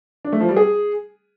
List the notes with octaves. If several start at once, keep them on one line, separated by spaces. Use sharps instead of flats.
D4
A3
F3
G3
G#4